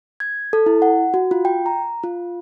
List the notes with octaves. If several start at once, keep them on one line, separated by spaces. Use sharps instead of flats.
G#6
A4
E4
F#5
F#4
F4
G5
A#5
F4